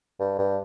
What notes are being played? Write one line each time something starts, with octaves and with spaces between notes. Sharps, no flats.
G2
G2